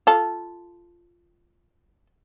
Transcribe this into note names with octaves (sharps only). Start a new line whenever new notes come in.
F4 A4